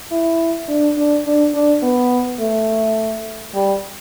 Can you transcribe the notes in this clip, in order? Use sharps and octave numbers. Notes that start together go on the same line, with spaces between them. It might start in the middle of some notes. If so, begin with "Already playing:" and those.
E4
D4
D4
D4
D4
B3
A3
G3